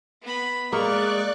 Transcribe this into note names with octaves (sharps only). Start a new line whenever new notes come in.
B3 B5
G#3 A#3 G#4 D5 C#6 F#6